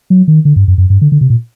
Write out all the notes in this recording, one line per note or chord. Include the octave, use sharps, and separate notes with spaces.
F#3
D#3
D3
G2
F#2
F#2
G2
D3
D3
C3
A#2